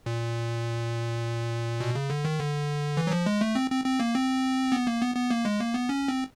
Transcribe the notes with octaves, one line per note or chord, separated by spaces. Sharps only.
A#2
B2
C#3
D3
D#3
D3
E3
F#3
F3
G#3
A3
C4
C4
C4
A#3
C4
B3
A#3
B3
B3
A#3
G#3
A#3
B3
C#4
C4